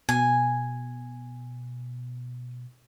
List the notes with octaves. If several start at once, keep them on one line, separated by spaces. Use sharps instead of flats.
B2 G#5